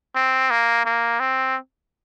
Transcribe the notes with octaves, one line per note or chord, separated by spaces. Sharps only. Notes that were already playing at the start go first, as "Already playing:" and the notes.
C4
A#3
A#3
C4